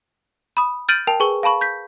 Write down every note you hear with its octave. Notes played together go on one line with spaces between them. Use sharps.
B5 D#6
F6 G6 A6 D7 D#7 F#7
A#4 G5 A5 F7
G#4 B4 G#5 C#6 G7
F5 A5 B5 C#6
G6 B6